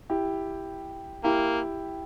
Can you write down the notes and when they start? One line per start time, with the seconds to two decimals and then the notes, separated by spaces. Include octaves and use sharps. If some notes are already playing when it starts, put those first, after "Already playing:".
0.10 E4 G4
1.24 A#3 E4 G4